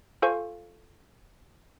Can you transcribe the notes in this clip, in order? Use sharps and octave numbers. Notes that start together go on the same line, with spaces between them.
F4 A4 C5 F5 G#5 C#6